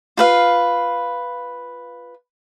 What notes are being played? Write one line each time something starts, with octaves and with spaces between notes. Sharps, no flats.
F4 B4 F5